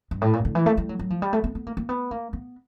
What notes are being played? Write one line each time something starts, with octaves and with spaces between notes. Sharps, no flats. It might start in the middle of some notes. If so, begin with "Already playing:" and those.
G2
A2
A#2
D3
E3
A3
G3
F#3
F#3
F3
G3
A3
B3
B3
A#3
A#3
B3
A#3
B3